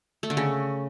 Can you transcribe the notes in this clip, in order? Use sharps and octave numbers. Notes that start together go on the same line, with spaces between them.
A3
D3
C#3